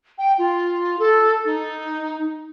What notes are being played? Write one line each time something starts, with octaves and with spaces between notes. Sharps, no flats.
G5
F4
A4
D#4